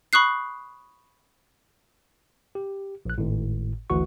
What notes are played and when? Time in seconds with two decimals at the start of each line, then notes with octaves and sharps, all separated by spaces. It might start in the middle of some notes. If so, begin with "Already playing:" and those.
0.13 B5 C#6 D#6 F#6 C7
2.55 G4
3.05 A#1 F#6
3.18 G#1 A2
3.90 G#1 D2 E3 F#4 C#6